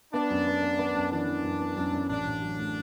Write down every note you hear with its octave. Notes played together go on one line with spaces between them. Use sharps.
B3 D4
F#2
B3
B3
B3
F#2
E3 D4
E3
F#2
B3
F#2
F#2
A1 D4
A1
F#3
A2